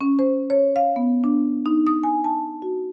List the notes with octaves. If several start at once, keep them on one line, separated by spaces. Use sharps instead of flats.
C#4
C5
C#5
F5
B3
D4
D#4
D#6
G#5
A5
F#4